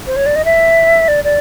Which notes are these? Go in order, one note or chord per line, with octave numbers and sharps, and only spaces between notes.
C5
C#5
D5
D#5
E5
D5
D5